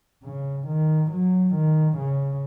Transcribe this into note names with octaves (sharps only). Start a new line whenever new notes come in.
C#3
D#3
F#3
D#3
C#3